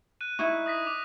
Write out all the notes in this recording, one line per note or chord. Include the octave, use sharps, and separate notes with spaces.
F#6 D#7
D#4 E4 C#6
D#6 A#6 B6
D6 F7